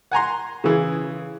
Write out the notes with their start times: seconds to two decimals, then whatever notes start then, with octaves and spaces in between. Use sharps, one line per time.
0.11 F#5 G#5 A#5 C6
0.64 C#3 E3 G#4